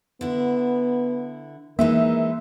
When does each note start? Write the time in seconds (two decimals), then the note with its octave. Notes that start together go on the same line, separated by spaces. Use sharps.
0.21 D3 B3 E4
1.79 E3 G#3 A#3 D#4 A#4 E5